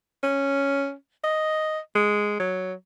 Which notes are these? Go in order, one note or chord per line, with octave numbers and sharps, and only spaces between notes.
C#4
D#5
G#3
F#3